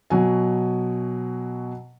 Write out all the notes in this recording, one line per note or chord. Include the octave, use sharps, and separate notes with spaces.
B2 F#3 G#5